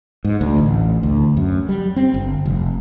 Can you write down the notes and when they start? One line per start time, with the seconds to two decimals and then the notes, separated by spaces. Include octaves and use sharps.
0.24 G#2
0.41 D2
0.58 A1
1.03 D2
1.37 F#2
1.69 G3
1.96 C4
2.14 G1
2.45 F1